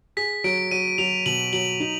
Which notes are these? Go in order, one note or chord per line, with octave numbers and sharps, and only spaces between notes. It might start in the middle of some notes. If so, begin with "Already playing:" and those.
G#4 B6
F#3 D7
F#3 D#7
F#3 F7
B2 F#7
F#3 F#7
D#4